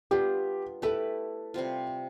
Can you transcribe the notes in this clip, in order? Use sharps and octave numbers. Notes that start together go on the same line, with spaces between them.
G3 B3 D4 F4 G4
A3 E4 G4 A4 B4
C3 G3 C4 F4